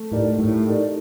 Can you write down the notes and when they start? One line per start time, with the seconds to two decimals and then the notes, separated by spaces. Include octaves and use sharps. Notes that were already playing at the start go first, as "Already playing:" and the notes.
Already playing: A3
0.11 A2 D#4 G4 A#4 D5
0.39 A2 A3
0.66 D#4 G4 A#4 D5